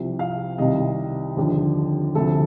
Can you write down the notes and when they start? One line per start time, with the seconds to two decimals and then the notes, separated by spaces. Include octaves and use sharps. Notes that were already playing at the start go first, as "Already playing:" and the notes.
Already playing: C2 C3 F3
0.19 F5
0.58 C2 C3 D#3 G3 D#5
1.37 D#2 D3 F3
2.15 D2 C3 F3 A4